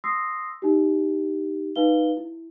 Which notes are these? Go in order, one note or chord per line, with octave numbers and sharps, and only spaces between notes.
C6 D#6 E6 A#6 C7
D#4 G4
D#4 B4 F5 G7
E4